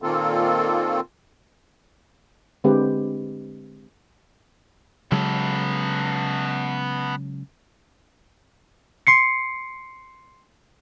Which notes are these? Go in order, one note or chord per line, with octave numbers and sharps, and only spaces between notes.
A#2 D#3 A#3 C4 F4 A4
D3 G#3 C4 G4 B4
C#3 F#3 G#3 B3 A4
C6 C7 C#7